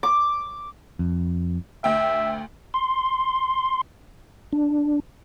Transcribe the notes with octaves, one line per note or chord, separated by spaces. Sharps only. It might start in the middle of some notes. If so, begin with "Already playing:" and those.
D6
F2
D2 E5 G5
C6
D4